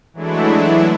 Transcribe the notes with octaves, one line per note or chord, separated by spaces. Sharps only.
E3 F#3 G#3 A3 D4 E4